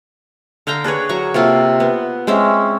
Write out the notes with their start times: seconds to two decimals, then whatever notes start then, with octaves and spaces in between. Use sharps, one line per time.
0.67 D3 F5 G5 A#5
0.84 D4 G#4 B4 C#5
1.09 F#3 A#5 C#6
1.34 C3 A#3 F4 A4
1.80 B3
2.27 G#3 C4 C#4 E5